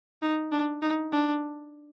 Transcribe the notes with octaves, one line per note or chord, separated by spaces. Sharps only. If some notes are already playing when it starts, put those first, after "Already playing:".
D#4
D4
D#4
D4